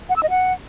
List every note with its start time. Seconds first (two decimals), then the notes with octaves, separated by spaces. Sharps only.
0.09 F#5
0.16 E6
0.23 D#5
0.30 F#5